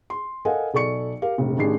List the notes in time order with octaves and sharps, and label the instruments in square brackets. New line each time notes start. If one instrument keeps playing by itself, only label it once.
[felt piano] C6
A4 A#4 D#5 F5 F#5 G#5
B1 A4 D5 C#6 C#7
G4 A#4 F5
F1 A#1
A1 D#3 D4 G4 G#4 C7